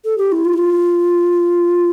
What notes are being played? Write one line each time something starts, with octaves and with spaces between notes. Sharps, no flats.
A4
G4
E4
F4
E4
F4